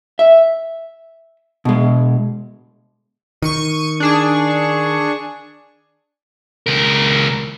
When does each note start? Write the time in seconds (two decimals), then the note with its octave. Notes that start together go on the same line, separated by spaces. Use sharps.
0.19 E5
1.65 B2 G#3
3.42 D#3 C#6 C#7 D#7
4.00 D4 G#4 C#6
6.67 C#2 A#4